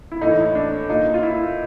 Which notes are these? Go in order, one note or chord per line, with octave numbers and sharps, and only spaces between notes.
E4
A2 E3 D#4
D4
A#2 D#4
F4
E4